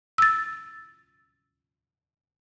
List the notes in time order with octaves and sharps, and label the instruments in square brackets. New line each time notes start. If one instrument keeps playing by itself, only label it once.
[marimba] E6 A6